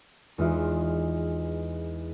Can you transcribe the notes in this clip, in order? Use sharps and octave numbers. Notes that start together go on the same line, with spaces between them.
E2 G#3 D#4 F4 E5 D7